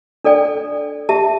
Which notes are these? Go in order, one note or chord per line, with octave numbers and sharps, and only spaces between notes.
D4 A4 D5 G5
G4 E5 A5